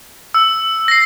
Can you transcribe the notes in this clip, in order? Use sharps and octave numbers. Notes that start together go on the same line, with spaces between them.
E6
A#6 C7